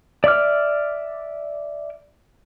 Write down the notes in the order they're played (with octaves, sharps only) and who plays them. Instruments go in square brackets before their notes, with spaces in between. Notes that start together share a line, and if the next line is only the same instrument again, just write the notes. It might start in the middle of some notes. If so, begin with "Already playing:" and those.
[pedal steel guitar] D5 E5 D6 F6